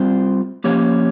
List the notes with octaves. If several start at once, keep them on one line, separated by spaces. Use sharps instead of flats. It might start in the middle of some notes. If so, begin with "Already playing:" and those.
Already playing: G3 C4 F4 C5
F3 A#3 C#4 G4 C#5